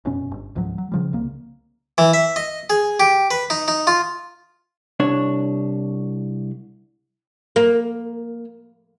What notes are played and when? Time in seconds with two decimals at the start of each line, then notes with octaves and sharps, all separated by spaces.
0.05 F1 F#2 B2 C#4
0.31 G1
0.56 C#2 G#2 F3 F#3
0.78 F#3
0.92 C#3 F3 G3
1.13 C2 C#3 A#3
1.98 E3
2.13 E5
2.36 D#5
2.70 G#4
3.00 G4
3.31 B4
3.50 D#4
3.68 D#4
3.87 F4
5.00 C2 D4 C#5
7.56 A#3